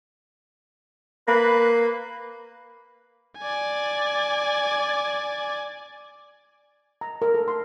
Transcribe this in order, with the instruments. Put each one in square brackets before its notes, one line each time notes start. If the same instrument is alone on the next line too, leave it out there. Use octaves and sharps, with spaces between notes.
[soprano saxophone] A#3 [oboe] B4
[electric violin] D5 G#5
[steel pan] A#5
A#4
A4
C6